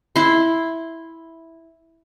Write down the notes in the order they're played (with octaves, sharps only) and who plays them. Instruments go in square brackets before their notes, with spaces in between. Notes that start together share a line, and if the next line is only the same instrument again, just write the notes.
[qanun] E4 C6